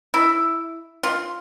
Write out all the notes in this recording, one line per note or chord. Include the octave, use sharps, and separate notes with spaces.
E4
F4